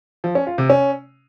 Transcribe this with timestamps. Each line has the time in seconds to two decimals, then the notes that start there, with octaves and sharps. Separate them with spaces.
0.24 F3
0.35 C#4
0.47 F4
0.58 C3
0.70 C#4